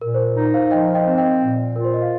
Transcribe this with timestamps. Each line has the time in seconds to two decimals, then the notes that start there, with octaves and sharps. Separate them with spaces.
0.01 A#2 A#4
0.14 C5
0.18 A#4
0.37 D#4
0.54 C5 F5
0.71 F3 D#5 G5
0.95 D#5 G5
1.07 C4
1.18 D#5 G5
1.41 A#2
1.76 F4 A#4
1.84 C5
1.94 D#5
2.02 F5